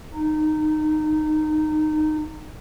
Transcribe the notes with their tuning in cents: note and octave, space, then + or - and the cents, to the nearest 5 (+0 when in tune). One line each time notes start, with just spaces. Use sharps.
D#4 -15